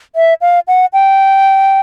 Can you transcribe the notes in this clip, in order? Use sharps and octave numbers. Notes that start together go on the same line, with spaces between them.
E5
F5
F#5
G5